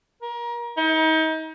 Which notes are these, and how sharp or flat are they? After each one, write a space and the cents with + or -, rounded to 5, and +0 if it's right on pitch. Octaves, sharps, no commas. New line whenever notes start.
A#4 +30
D#4 +35